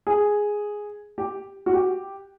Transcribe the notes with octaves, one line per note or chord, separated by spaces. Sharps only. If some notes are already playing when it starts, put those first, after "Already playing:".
G#4
G4
F#4
G4